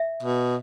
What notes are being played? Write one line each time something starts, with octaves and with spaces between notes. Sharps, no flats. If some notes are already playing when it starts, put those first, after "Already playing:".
Already playing: E5
B2